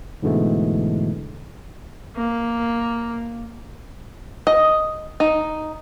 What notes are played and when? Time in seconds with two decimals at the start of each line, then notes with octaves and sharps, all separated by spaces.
0.23 G#2 B2 D3 E3 G#3 A3
2.16 A#3
4.47 D#5
5.20 D#4